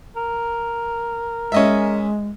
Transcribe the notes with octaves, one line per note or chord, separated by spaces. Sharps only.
A#4
G#3 C#4 D#5 E5